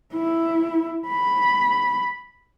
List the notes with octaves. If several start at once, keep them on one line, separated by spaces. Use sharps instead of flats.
E4
B5